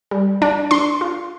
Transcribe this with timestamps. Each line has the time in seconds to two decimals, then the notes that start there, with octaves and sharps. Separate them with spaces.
0.11 G3
0.42 D4
0.71 D4 C6
1.01 F4